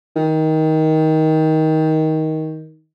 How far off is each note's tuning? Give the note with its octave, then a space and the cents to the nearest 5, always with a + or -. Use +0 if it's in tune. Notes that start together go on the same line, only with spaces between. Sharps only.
D#3 +15